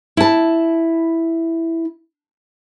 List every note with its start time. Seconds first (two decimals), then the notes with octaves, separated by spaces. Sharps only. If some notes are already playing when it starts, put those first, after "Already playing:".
0.17 E4 A5